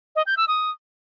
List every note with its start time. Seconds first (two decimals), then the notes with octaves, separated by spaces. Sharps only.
0.16 D#5
0.26 G6
0.37 E6
0.48 D#6